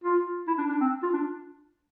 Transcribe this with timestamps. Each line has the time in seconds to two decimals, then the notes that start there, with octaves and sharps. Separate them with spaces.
0.04 F4
0.47 E4
0.58 D4
0.69 D4
0.81 C4
1.03 F4
1.13 D4